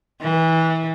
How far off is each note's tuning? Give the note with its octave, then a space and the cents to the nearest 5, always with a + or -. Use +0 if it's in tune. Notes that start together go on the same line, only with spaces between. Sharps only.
E3 -25